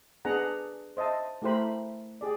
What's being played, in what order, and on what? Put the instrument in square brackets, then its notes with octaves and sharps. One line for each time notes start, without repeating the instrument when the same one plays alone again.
[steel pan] B3 D4 G#4 F#5 A#5
C5 D#5 E5 A5
A3 E4 G4 A#4 C5 B5
G4 G#4 D5